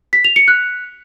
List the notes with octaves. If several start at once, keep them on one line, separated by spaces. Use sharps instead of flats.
B6
F7
C#7
F#6